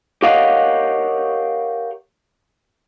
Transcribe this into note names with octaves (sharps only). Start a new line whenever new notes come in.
G4 A#4 C#5 D#5 F5 F#5